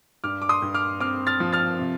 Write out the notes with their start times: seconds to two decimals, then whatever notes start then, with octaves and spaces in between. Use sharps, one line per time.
0.24 G2 D6 F6
0.42 D6
0.49 C6 D#6
0.62 G2
0.74 D6 F6
1.00 C4 D6 F6
1.27 F6 A6
1.40 F3
1.53 F6 A6
1.79 C3